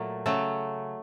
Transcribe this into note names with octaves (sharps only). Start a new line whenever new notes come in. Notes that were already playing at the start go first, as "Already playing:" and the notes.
Already playing: A#2 F#3 A3
C#3 F#3 A3